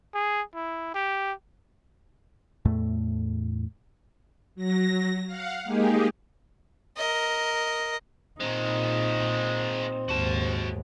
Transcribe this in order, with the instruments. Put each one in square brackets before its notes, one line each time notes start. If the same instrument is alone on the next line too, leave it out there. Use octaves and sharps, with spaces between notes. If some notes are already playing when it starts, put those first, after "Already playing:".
[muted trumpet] G#4
E4
G4
[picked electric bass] E2 A2 A3
[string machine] F#3 A#6
F5 F#5
G#3 A#3 D#4 G4 G#4
[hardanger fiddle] A#4 D#5
[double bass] A#2 D#4 [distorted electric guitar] D#3 G#3 [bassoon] C4
[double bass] D#2 G#2 [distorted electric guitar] F#4 A5